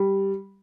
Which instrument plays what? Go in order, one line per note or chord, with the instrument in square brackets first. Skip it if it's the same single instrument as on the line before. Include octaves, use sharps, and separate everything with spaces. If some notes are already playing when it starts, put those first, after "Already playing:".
Already playing: [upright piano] G3